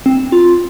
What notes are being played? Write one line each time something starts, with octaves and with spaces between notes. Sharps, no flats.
C4
F4